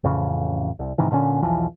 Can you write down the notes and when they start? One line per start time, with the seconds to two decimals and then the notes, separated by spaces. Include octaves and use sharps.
0.04 A1 F2 C#3
0.79 C2
0.98 G#2 C3 D#3 E3
1.11 G2 A#2 D3 C#4
1.43 B1 E2 E3 F3